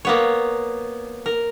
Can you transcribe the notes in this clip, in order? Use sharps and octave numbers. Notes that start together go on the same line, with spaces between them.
A#3 B3 C#5
A#4